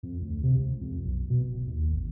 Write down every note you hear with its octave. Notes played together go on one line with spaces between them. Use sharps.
F2
D2
C3
C#2
F2
B1
B2
D1
D#2
G#1